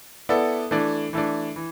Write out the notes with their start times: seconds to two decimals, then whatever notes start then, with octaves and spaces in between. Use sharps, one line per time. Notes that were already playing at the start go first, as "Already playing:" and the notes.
0.29 B3 E4 A4 D5
0.71 E3 A3 D4
1.13 E3 A3 D4
1.56 E3